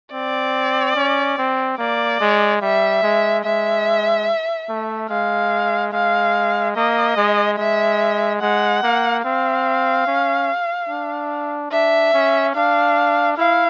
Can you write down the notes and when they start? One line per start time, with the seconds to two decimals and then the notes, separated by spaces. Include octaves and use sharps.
0.13 C4 D5
0.96 C#4
1.38 C4
1.78 A#3 D5
2.21 G#3
2.62 G3 E5
3.03 G#3
3.44 G#3 E5
4.69 A3
5.09 G#3 F5
5.93 G#3 F5
6.76 A#3 D#5
7.17 G#3
7.58 G#3 E5
8.41 G#3 F#5
8.83 A#3
9.24 C4 F5
10.07 C#4
10.89 D4
11.72 D4 E5
12.14 C#4
12.55 D4 F5
13.37 E4 F5